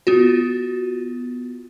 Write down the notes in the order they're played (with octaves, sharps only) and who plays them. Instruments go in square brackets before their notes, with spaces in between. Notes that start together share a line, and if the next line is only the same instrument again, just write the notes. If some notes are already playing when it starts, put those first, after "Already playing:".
[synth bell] B3 F4 F#4